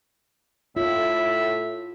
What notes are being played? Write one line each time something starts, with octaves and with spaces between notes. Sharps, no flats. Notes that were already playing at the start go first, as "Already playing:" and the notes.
A2 F4 E5